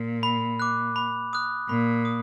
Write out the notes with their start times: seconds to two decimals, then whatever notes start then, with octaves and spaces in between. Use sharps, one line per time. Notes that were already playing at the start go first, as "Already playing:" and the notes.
Already playing: A#2
0.23 B5
0.60 D6 F#6
0.96 B5
1.33 D#6 F#6
1.69 A#2 B5
2.05 D#6